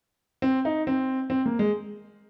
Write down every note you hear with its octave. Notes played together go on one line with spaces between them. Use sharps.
C4
D#4
C4
C4
A#3
G#3